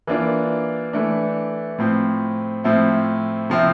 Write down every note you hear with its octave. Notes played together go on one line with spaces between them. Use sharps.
E3 A#3 D4 F4
E3 A3 D4
A2 F3 C4
A2 F3 C4 E4
C3 F3 C4 E4